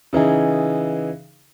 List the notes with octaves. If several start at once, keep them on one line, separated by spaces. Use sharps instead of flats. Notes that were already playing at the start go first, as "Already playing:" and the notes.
C#3 E3 D#4 G#4